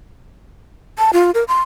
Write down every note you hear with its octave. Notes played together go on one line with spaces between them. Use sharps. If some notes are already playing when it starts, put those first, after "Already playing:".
A5
F4
A#4
C6